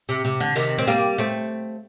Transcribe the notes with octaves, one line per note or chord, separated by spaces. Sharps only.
C3
C3
D3
C3 D#3
C4
G3 A#3
A3 C4